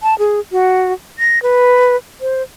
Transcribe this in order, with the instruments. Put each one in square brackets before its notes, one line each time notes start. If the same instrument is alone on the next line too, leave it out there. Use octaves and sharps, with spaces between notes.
[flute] A5
G#4
F#4
A#6
B4
C5